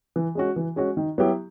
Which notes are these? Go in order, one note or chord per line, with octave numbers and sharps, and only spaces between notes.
E3
G#3 C#4 F#4
E3
G#3 C#4 F#4
D#3
F#3 B3 E4 G4